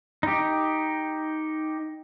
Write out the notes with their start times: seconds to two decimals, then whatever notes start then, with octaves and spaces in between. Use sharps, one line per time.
0.23 D#4 G4